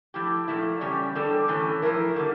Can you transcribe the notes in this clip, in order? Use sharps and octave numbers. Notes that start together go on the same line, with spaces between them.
F3 A3 E4 G4
A#2 F3 A3 E4
E2 C#3 G3 C#4 G4
E2 D3 G3 D4 A4
A2 E3 A3 C#4
G2 F3 A3 E4 A#4
D3 G3 A#3